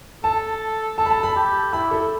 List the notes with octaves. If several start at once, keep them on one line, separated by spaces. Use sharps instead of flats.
A4 A5
A4 A5
B5
A5
B5
G4
E4 B5
A4